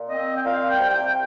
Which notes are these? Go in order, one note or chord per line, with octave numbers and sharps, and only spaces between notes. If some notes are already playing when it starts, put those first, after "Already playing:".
Already playing: A#2
C4 D#5
G5
A#2 F5
G5
C2
G5